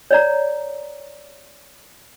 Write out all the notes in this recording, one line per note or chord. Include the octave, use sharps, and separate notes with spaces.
C#5 D5 A#5